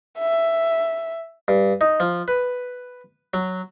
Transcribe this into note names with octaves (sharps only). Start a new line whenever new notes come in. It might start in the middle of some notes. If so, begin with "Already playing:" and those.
E5
G2
D#4
F3
B4
F#3